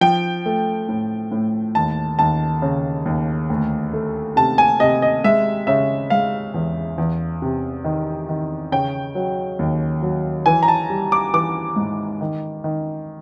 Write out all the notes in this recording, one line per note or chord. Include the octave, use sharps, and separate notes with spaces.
F3 G5
A3
A2
A2
D#2 A5
D#2 A5
C#3
D#2
D2
A3
C3 A5
G#5
C3 D#5
D#5
G#3 E5
C#3 E5
G#3 F5
E2
E2
C3
D#3
D#3
C#3 G5
F#3
D#2
F#3
E3 G#5
A#5
A5
G3
D6
E3 D6
G#2
D#3
D#3